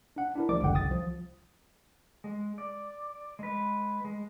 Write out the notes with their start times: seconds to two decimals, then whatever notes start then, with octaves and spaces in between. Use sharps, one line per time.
0.16 D4 F#5
0.36 D4 E4 A#4
0.49 D2 F3 G3 D5 D6
0.62 G1 C#2 F#2 D3 F#5 G5
0.74 C2 D#6 A6
0.91 F3
2.24 G#3
2.58 D5
3.39 G#3 B4
4.05 G#3